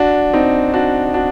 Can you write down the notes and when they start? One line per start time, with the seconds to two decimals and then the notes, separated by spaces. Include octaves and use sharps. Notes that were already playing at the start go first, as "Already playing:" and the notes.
Already playing: D4 F#4
0.34 C4 D#4
0.74 D4 F#4
1.14 D4 F#4